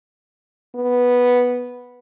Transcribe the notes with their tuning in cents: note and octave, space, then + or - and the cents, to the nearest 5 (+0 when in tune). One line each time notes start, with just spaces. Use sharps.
B3 -5